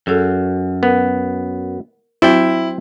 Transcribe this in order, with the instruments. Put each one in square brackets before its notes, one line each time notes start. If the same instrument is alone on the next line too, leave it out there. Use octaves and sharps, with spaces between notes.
[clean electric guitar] F#2 [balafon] G#4 A4
[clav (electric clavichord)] B3 [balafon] A#4
[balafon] F#3 C4 F#4 [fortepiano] E4 [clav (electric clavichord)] C5 G5